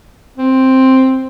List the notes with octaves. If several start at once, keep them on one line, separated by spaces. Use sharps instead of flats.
C4